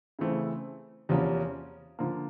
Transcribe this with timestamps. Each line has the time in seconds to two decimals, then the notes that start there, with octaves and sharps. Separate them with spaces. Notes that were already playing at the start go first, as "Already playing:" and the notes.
0.19 C#3 E3 A3 C4
1.09 E2 C3 F3 A#3 C#4
1.99 D3 F3 A#3